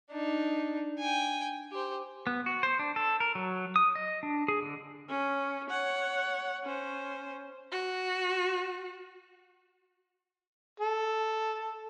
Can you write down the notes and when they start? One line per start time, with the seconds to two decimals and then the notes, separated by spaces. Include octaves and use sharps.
0.11 D4 D#4
0.99 G5 G#5
1.71 G4 C5
2.27 B3
2.46 F#4
2.63 C5
2.79 D4
2.96 A4
3.20 A#4
3.35 F#3
3.76 D#6
3.95 D#5
4.23 D4
4.48 G#4
4.62 D3
5.09 C#4
5.70 C#5 F#5
6.64 C#4 C5
7.72 F#4
10.80 A4